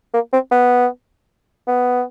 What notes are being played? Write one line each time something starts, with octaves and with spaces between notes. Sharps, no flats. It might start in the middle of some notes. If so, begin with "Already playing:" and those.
A#3
C4
B3
B3